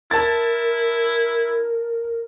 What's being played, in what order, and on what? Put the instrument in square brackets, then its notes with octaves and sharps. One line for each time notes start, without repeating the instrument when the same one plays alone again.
[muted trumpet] E4 [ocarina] A#4 [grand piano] A5 A6